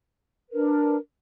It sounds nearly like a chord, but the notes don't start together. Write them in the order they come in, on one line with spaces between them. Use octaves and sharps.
B4 A#4 D4